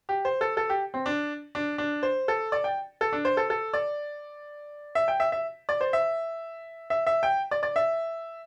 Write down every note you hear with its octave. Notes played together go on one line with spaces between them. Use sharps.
G4
C5
A4
A4
G4
C4
D4
D4
D4
C5
A4
D5
G5
A4
D4
C5
A4
A4
D5
E5
G5
E5
E5
D5
C5
E5
E5
E5
G5
D5
D5
E5